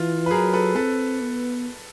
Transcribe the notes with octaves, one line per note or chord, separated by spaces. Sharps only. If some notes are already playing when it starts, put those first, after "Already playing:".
Already playing: E3 F4
B4
F#3 G#4 A#4
A4 B4
C4 A4 B4
B3